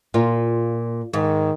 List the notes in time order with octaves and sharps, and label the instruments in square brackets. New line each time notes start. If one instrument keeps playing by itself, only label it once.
[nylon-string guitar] A#2 [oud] F4
[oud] G#2 [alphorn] D#3